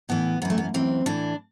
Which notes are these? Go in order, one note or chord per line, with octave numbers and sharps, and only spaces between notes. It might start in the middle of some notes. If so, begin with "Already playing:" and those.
A2 E3 B3
F#2 E3 B3
A3
B3
F#2 E3 C4
A2 E3 D4